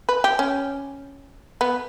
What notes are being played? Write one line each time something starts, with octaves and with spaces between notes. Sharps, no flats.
B4
G4
C#4
B3